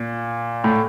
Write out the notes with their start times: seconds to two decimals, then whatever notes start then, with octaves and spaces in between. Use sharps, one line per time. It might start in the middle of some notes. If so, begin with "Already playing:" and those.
Already playing: A#2
0.64 A2